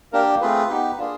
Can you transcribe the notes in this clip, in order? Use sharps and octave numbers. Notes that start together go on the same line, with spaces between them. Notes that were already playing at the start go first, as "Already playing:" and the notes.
A#3 D4 G4 A#4
A3 C4 F4 G#4 B4
B3 D#4 G4
A#3 D4 F4 G#4